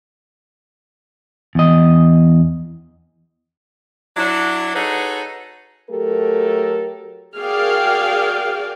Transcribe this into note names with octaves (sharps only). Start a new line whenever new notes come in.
E2 D#5
F#3 D4 E4
D#4 F#4 G#4 A4 B4 C#5
F#3 A3 G4 A4 A#4
F#4 G#4 A#4 D5 F5 G5